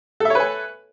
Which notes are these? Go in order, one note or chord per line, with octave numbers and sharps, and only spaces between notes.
A4 B4 C#5 E5 G#5